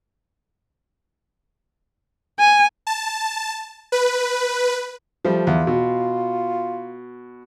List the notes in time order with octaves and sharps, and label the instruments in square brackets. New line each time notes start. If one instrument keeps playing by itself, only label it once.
[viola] G#5
[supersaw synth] A5
B4
[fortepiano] F3 G3 [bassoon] A3
[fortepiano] E2 [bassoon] F4
[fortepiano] B2